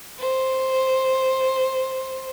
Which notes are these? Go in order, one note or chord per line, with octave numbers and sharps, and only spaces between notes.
C5